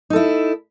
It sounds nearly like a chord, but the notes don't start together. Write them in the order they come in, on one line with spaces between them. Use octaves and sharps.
D#4 A4 E4